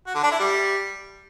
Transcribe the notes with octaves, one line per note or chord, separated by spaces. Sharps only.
F#4
D3
D4
E4
G3